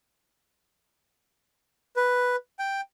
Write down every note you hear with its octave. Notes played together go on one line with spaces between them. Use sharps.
B4
G5